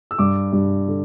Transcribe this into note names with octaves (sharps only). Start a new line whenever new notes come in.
E6
G2 D6
G2
D3